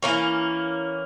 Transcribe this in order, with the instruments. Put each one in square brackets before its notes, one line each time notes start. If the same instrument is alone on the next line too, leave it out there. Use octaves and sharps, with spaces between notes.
[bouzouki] E3 A#3 C#4